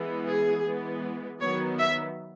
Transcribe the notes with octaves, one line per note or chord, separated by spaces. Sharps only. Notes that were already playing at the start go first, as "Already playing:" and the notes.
Already playing: E3 G#3 B3
G#4
E3 G#3 B3
D#3 F#3 B3 C#5
E5